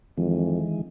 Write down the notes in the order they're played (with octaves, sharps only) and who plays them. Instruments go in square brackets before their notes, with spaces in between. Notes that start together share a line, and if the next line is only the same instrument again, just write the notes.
[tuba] F2 [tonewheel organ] D#3 E3 G#3